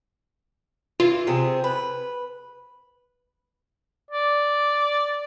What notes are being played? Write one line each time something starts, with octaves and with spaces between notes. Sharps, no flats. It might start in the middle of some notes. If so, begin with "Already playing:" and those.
E3 F4
C3 G#4
B4
D5